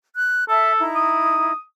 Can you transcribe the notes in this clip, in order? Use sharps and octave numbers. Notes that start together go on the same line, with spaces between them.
F#6
A4 E5 A5
D#4 E4 A#5
D#6